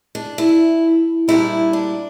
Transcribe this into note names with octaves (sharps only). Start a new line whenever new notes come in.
D4
E4
A#2 G3 D4 E4
D4